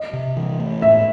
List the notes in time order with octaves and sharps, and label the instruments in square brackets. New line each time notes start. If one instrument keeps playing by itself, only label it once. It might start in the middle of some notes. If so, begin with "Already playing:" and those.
Already playing: [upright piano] D#5
[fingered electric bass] C3
E3
A3
[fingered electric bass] A2 [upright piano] E5